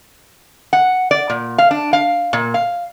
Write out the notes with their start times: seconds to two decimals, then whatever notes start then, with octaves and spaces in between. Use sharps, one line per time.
0.73 F#5
1.11 D5
1.30 A#2
1.58 F5
1.71 D4
1.93 F5
2.33 A#2
2.54 F5